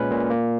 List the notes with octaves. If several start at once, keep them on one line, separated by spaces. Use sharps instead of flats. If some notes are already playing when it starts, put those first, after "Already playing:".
Already playing: A#2 G#3 C#4 B4
A#2
A#3